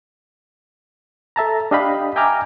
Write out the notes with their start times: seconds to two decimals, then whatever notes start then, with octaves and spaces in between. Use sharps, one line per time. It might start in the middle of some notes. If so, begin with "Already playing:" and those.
1.36 A4 E5 A5 A#5
1.71 D4 G4 D#5 F5 G5 B5
2.16 E5 G5 G#5 A#5 D6 F6